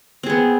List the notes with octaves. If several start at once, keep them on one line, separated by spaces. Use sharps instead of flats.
B3 C4 G#4